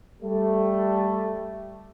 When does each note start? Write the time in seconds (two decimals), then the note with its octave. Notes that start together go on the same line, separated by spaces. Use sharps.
0.23 G3 A3